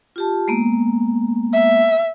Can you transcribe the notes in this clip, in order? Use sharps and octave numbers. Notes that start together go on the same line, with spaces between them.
F4 G4 A5
G#3 A#3 B3
E5